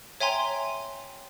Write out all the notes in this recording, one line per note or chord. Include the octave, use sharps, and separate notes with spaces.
C#5 E5 G5 G#5 A#5 C6